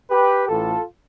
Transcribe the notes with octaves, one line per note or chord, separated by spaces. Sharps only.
G4 B4
A1 A2 E3 F4 A4